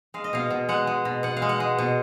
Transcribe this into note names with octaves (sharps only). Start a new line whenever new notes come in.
G#3 F5
D#5
B2 F5
B2
G#3 F#5
G#3
B2
B2 F#5
F5
G#3
F#5
G#3
B2